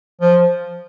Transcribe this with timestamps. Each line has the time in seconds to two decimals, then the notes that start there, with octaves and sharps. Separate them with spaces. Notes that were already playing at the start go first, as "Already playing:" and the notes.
0.21 F3